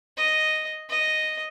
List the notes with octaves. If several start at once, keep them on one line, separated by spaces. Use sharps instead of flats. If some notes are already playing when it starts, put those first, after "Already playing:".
D#5
D#5